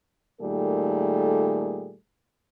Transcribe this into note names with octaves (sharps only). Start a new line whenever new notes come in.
A#2 D#3 G3 A3 G#4 A4